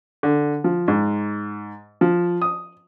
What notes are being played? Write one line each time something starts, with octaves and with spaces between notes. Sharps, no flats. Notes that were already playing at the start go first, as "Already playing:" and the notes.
D3
F3
G#2
F3
D#6